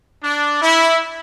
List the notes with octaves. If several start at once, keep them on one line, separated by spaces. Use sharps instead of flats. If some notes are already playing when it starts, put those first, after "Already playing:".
D4
E4